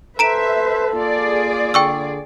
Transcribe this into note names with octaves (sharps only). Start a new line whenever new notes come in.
A4 B4 C5 E5 A#5 D7 E7
A#3 F4 G#4 D5
D3 G5 C#6 E6